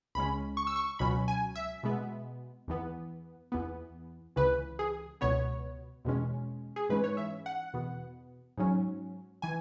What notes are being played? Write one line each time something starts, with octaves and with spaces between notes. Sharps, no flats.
C#2 C#3 G#3 C#4 B5
C#6
E6
C#6
C#2 B2 F#3 C#4 B5
G#5
E5
B2 G#3 B3
E2 E3 B3
E2 E3 B3
C#2 C#3 E3 B4
G#4
C#2 B2 B3 C#5
E2 B2 G#3 C#4
G#4
G#2 E3 G#3 C#4 B4
C#5
E5
F#5
E2 B2 B3
G#2 F#3 C#4
E3 G#5